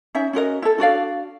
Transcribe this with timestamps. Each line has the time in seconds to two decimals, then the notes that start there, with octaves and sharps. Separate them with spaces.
0.15 C#4 D#4 E5
0.33 C#4 F#4 A#4 D#5
0.62 E4 A4
0.78 D4 F#4 D5 F5